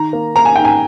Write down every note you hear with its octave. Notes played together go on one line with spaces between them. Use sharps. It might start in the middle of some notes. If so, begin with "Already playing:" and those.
Already playing: D#3 A#5
A#3
A#3 A#5
G#5
G#2 G5
G#5